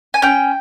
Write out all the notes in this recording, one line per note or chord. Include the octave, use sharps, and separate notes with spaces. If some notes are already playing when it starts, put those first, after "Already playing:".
G#5
C#4 G5